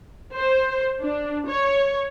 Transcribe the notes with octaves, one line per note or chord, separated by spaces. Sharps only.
C5
D4
C#5